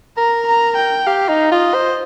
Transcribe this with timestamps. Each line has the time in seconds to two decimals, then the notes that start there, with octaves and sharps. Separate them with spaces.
0.17 A#4 A#5
0.47 A#5
0.77 G5
1.07 G4 F5
1.29 D#4
1.51 F4 D#5
1.74 C5